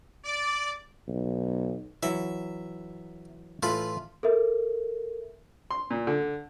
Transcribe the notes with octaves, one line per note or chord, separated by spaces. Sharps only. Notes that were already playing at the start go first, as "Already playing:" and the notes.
D5
B1
E3 F#3 E5
A2 E3 F4 A4 B4
A4 A#4 E5
C6
A#2
D3